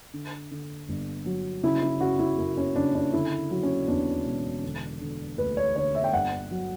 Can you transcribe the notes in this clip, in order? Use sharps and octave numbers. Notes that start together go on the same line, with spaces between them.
D3
D3
G1
F#3
C#3 E4
E4
C#3 F#4
E4
F#2
C#4
C#3 D4
D4
D3 E4
F#3
C#4
E2 D4
E1
D3
D3
D2 B4
C#5
D3 C#5
E5
G5
G1 F#5
F#3